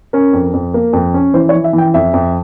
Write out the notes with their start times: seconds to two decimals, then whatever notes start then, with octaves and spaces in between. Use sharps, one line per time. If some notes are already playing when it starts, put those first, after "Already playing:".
0.13 C#4 A#4
0.33 F2
0.53 F2
0.74 A#3
0.93 F2
1.14 C#4
1.34 E3 C5
1.49 C#5
1.54 E3
1.64 E5
1.73 E3
1.78 G5
1.94 F2 E5
2.13 F2